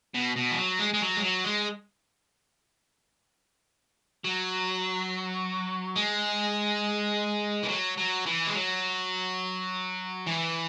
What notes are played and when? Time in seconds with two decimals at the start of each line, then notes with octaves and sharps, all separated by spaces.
0.14 B2
0.36 B2
0.51 E3
0.58 F#3
0.79 G#3
0.94 G#3
1.01 F#3
1.17 G#3
1.22 F#3
1.44 G#3
4.24 F#3
5.96 G#3
7.63 E3
7.68 F#3
7.97 F#3
8.26 E3
8.47 G#3
8.54 F#3
10.27 E3